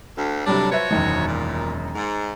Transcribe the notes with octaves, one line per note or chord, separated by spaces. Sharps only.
D2
A2 C3 F#3 G3 D4
F3 F#4 B4 C#5 E5
E1 F#2 D#3
A#2
G#2